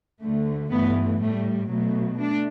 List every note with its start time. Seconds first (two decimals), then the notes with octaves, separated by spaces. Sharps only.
0.22 D2 D3 A3
0.71 G2 E3 A3 B3
1.21 A2 G3 A3
1.70 B2 F#3 A3
2.20 A3 D4